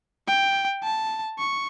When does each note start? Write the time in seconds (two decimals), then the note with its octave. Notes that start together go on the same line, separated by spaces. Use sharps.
0.27 G5
0.83 A5
1.39 C#6